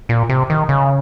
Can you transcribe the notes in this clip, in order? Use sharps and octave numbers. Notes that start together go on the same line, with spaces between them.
A#2
C3
D#3
C#3